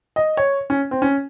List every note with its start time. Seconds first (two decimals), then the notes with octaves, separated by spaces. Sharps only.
0.16 D#5
0.37 C#5
0.70 C#4
0.91 C4
1.02 C#4